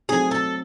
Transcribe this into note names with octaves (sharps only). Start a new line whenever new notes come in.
F#3 A3 C4 D#4 G#4
A4